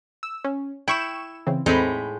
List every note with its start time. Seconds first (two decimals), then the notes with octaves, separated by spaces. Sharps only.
0.23 E6
0.44 C#4
0.88 E4 G5 C#6 E7
1.47 C#3 E3 C4
1.66 E2 A2 G#3 C4 D#4 B5